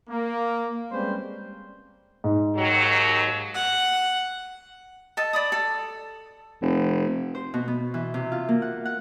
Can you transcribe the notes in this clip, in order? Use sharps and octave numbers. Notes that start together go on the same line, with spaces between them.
A#3
G3 G#3 C4 C#4 B4 C5
G#2
D#2 F#3
F#5
A4 D#5 A5
D5 B5 D#6
A4
F1
C5
B2
B3
E3
C3
F4
A#3
F#5
F#5